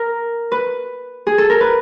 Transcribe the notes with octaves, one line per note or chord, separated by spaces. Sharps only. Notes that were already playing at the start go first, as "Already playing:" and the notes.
Already playing: A#4
B4
G#4
A4
A#4
B4